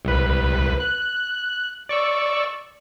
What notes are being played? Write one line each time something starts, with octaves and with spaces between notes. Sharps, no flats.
C2 B4
F#6
D5 C#6 E6